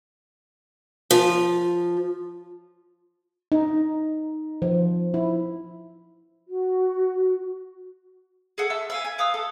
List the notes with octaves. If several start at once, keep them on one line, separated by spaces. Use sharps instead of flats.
F3
D#4
F3
E4
F#4
G#4 A4 F#5
E5 A5 C#6 E6
E5 F5 G#5
G#5
B4 F5 D#6 E6
A4